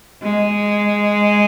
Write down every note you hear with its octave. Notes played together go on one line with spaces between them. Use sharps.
G#3